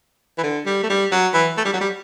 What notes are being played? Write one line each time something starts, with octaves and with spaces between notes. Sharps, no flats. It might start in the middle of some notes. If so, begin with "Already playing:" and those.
E3
D3
G3
A3
G3
F#3
E3
A3
G3
F#3
G3